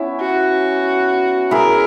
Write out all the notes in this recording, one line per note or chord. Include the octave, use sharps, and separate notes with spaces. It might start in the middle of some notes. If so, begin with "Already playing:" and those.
Already playing: B3 C#4 E4
F#4
E4 G#4 A#4